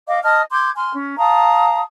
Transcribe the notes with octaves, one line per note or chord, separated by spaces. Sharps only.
D#5 F5 D6
D#5 A5 D#6 F6
C6 D6 G6 G#6
G#5 C6 F6
C#4
F5 A5 A#5 D#6